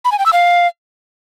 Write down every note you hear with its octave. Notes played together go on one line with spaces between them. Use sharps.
B5
G#5
G5
E6
F5